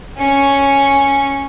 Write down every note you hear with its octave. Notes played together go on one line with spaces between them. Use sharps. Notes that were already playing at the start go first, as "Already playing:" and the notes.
C#4 C#6